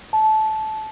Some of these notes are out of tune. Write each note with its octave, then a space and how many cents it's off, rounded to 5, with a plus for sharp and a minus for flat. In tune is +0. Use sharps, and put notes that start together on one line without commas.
A5 -15